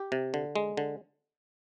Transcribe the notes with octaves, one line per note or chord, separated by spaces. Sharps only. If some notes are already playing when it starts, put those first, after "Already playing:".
Already playing: G4
C3
D3
G#3
D3